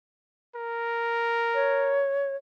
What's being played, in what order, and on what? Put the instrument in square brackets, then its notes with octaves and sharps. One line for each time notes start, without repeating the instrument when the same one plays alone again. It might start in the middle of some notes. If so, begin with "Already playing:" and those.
[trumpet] A#4
[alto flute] C#5